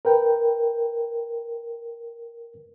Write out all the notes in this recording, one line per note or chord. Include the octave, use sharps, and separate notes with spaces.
A#4 B4 G5